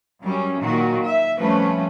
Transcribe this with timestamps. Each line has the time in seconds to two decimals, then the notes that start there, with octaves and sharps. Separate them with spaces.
0.23 F#2 G3 C#4
0.60 A#2 D#3 F#3 F#4
1.04 E5
1.38 F2 F3 G3 A3 C#4 B4